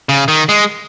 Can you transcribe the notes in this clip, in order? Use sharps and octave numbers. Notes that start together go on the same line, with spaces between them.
C#3
D#3
G#3